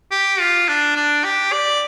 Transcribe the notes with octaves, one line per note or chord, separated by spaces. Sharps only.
G4
F4
D4
D4
G4
D5